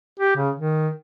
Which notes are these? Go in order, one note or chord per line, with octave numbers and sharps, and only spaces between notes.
G4
C#3
D#3